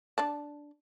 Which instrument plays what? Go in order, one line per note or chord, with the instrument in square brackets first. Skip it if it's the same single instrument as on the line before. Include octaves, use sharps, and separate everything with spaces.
[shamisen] D4 D5 A5